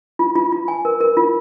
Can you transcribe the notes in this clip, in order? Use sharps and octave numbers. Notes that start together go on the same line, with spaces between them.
F4
F4
F4
G#5
A#4
A#4
F4